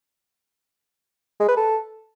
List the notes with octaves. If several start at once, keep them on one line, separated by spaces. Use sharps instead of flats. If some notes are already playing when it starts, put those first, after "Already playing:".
G#3
B4
A4